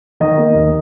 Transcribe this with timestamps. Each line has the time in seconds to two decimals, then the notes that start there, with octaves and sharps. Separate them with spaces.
0.20 D#3 D#5
0.37 A#3
0.55 D#2